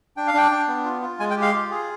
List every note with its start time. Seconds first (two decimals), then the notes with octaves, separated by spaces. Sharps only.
0.17 D4 G5
0.27 F5
0.34 D4 G5
0.51 D4
0.68 B3
0.85 F4
1.02 F4
1.20 G#3 G#5
1.30 G5
1.37 G4
1.42 F5
1.53 F4
1.71 G#4